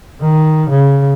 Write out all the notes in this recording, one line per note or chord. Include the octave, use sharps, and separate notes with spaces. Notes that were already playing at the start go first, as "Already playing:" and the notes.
D#3
C#3